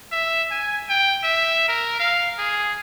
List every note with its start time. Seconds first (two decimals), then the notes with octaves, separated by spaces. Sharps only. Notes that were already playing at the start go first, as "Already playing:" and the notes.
0.12 E5
0.51 G#5
0.89 G5
1.23 E5
1.68 A#4
1.99 F5
2.38 G#4